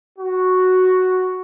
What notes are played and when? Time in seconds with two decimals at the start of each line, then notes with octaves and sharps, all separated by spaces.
0.19 F#4